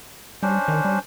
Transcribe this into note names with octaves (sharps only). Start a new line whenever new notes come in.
G3 C#4 D4 C5
D#3
G3